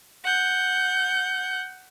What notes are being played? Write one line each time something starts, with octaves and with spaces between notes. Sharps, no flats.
F#5 G6